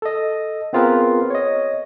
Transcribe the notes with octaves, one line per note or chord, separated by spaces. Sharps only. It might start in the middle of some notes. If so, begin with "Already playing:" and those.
A4 D#5
B3 C4 F4 G#4 A#4 B4
C#5 D#5